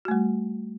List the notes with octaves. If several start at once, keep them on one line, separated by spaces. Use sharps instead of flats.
G3 A3 F#4